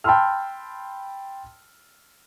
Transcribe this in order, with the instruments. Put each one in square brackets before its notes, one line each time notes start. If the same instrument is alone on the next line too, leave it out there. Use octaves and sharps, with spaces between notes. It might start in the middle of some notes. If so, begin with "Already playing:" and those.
[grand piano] G5 A5 B5 C6 E6 F6